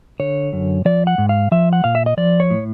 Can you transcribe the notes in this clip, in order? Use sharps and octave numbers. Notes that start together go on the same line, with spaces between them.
D3 C#5
F#2
F3 D5
F#5
G#2
F5
F3 E5
F#5
A#2 F5
E5
D#5
F3 D5
C#5
A2